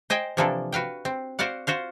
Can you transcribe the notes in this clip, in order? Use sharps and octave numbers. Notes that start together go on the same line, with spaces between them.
C5 D#5 G5 G#5
C3 E3 F3 A#3 D4 A4
F#4 B4 F5 G5
C4
F#4 C5 D5 F5 F#5
F4 F#4 C5 F5